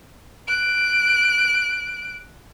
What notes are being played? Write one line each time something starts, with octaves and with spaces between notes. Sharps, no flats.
F#6 D7